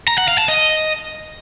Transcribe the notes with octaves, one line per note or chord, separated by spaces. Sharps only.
A#5
F#5
F5
A5
D#5